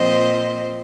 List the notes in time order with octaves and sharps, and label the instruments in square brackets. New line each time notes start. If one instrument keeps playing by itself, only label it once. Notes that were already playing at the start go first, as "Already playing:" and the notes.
Already playing: [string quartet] A#2 F3 C4 F4 C5 D#5